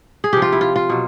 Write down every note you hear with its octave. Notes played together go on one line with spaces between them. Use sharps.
G#4
C3 F3 G4
F4
E4
F4
F4
B2 F#3